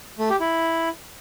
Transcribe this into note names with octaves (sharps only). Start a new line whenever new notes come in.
A3
G4
E4